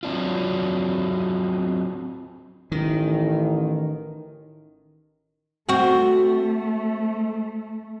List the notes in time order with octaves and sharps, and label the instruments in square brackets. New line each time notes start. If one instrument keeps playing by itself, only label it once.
[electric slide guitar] F#3 C4 D4 F4
[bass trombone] A1 [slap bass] D#3
[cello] A3 [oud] C4 F#4